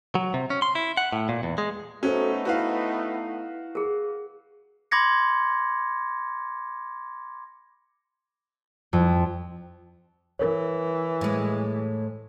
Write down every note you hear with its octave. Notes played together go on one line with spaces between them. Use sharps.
F#3
C3
C#4
C6
E4
F#5
A2
A#2
E2
G#3
A3 B3 C#4 D#4 F#4 A4 A#4 C5
E4 F#4 B4 C#5 F5 F#5
G#4 A#4
B5 C6 D6 G#6 A#6 C#7
F2
E3 A#4 C#5
A2 G#3